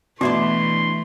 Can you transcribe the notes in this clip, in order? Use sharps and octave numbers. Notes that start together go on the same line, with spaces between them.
B2 E3 A3 D4 E4 D5 C6